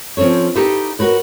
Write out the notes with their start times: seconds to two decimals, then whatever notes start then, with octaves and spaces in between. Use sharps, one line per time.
0.17 F3 C4 C#4 A4 C#5
0.55 D#4 G4 A4 B4 E5
0.99 F#4 A#4 B4 C#5